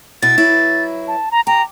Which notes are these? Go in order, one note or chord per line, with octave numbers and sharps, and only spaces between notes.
B2 E4 A6
F#3 E4 B4
A5
A#5
G4 A#5